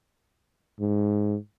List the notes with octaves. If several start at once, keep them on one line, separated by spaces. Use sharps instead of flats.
G#2